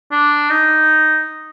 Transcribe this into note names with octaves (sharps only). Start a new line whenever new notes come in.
D4
D#4